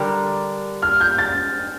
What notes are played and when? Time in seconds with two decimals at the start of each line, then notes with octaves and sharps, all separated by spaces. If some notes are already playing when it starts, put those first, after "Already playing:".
Already playing: D3 G3 D4 G4 A#4
0.82 F6
1.00 G6
1.18 A6